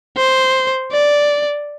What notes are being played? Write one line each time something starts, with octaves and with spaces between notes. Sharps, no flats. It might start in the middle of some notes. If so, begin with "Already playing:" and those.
C5
D5